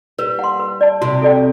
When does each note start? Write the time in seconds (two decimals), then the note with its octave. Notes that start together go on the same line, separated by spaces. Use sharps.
0.19 G3 B4
0.39 F#5 C6
0.59 B4
0.81 D5 A5
1.01 C3 F#4
1.22 A4 D5 G5